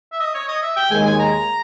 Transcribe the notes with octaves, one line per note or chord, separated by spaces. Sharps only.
E5
D#5
C#5
D#5
E5
G5
D#2 D#3 G#3 G#5
G#5
A#5